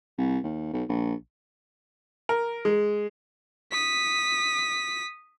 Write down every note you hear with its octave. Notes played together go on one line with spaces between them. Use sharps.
C2
D#2
B1
A#1
A#4
G#3
D#6 B6